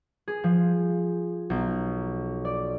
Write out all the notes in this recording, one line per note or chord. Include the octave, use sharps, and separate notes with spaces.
G#4
F3
B1
D5